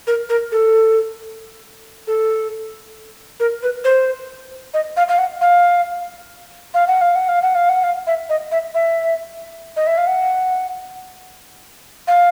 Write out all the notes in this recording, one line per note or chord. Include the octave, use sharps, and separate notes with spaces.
A#4
A#4
A4
A4
A#4
B4
C5
D#5
F5
F5
F#5
F5
F5
F#5
F5
F#5
F5
F#5
F5
F#5
F5
E5
D#5
E5
E5
D#5
E5
F5
F#5
F5